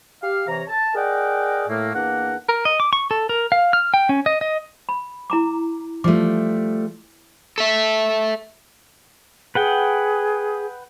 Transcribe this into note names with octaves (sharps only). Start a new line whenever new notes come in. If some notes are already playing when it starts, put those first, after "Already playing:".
G4 F5
C3 E3 C#5 A#5
A5
G#4 A#4 D5 D#5 F#5 G5
A2 A3 A#3
E2 A#3 D4 A#4 F#5
A#4
D#5
D6
C#6
A4
A#4
F5
F6
G5
C#4
D#5
D#5
B5
E4 A#5 D6
F3 G3 A3 D6
A4 E5
G#4 B4 F#5 G5